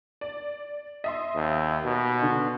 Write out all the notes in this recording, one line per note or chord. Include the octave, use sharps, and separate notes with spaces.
D5
D#5 E5 C6
D#2
B2
D3